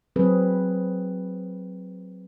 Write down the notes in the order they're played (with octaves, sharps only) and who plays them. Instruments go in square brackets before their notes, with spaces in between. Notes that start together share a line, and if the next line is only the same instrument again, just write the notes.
[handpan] F#3 C4 G#4 B4